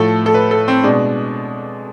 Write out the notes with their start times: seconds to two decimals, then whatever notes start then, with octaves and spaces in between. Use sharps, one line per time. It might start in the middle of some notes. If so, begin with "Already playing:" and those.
Already playing: A2 F3 A3 A4
0.26 A4
0.34 B4
0.51 A4
0.68 C4
0.83 B2 G#3 D4